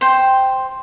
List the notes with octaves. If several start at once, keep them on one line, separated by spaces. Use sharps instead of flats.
C5 G5